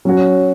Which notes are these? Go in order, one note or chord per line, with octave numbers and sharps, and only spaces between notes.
F#3 C#4 F#4 C#5